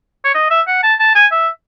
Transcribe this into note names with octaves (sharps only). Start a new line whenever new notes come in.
C#5
D#5
E5
F#5
A5
A5
G#5
E5